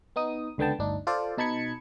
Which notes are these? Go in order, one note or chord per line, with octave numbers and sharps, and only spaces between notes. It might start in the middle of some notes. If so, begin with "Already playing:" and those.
B3 D#4 D#6
C#2 D3 B3 G5 A5
G1 D2 D4 D#4
F4 A4 C5 D5
B2 D#4 A5 B5 G#6 C#7